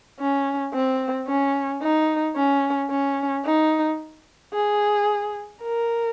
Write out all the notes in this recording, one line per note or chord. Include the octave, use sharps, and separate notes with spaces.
C#4
C4
C#4
D#4
C#4
C#4
D#4
G#4
A#4